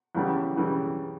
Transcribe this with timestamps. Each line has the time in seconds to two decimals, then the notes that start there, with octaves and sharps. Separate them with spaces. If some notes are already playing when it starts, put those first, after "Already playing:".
0.15 E2 C#3 E3 G3
0.56 C#3 E3 G3